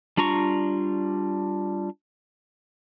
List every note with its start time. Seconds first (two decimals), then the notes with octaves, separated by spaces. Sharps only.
0.17 G3 D4 F4 A#5 C#6